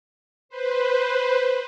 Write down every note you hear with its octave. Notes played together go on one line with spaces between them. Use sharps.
B4 C5